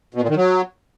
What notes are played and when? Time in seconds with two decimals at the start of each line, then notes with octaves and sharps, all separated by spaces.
0.14 B2
0.22 A#2
0.29 D#3
0.37 F#3